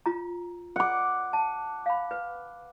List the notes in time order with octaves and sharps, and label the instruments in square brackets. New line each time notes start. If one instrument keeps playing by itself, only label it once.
[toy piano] F4 A#5
[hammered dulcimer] F#5 D6
[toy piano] A5
F5 B5
B4